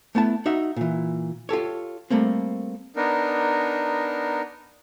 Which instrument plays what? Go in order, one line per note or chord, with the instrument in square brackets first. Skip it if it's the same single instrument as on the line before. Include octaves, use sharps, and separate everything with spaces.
[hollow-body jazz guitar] A3 B3 E4 A5
D#4 F#4 E5
A#2 E3
F4 G4 A4 C#5
G3 A3 A#3 C4
[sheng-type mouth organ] B3 D4 D#4 A#4